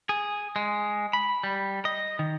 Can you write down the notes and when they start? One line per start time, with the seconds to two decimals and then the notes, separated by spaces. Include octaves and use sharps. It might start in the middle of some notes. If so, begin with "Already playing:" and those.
0.09 G#4
0.56 G#3
1.13 B5
1.44 G3
1.85 D#5
2.19 D#3